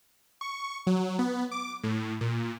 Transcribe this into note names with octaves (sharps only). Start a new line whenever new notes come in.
C#6
F#3
B3
D6
A2
A#2